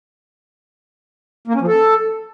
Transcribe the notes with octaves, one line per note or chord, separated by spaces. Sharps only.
A#3
C#4
F3
A4